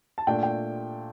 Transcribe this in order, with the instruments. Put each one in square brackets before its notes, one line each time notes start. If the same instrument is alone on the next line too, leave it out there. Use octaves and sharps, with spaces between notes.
[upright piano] A5
A#2 A3 D4 G5
G5